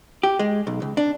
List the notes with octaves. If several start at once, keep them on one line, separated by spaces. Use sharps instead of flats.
G4
G#3
B1
C#2
D4